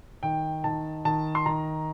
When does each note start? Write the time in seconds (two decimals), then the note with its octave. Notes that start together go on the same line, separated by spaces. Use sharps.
0.23 D#3 G5
0.64 D#3 A5
1.05 D#3 A5
1.35 C6
1.46 D#3 A#5